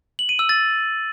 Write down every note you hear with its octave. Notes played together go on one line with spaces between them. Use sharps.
F#7
D#7
E6
A6